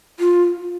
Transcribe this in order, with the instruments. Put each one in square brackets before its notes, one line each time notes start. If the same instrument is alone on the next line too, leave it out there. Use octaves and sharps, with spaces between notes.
[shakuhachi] F4